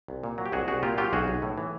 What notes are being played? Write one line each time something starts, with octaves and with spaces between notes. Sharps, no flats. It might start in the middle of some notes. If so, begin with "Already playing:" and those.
C2
A#2
F#3
G4
C2 F#4 G#4
C2 F#4 G#4
A#2 F4 G4
F#3 F4 G4
B1 F#4 G#4
B1
A2
E3